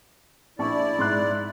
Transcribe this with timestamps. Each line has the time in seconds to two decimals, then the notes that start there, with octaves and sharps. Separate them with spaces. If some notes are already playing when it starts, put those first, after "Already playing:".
0.59 A#1 E4 D5 A5 C#6
0.99 G#2 C6 F#6